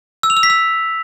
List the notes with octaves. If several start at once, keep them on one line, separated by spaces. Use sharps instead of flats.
E6
F7
E6
B6
E6